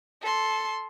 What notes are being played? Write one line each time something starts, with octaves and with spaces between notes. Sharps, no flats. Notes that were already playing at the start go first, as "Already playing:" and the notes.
A4 C6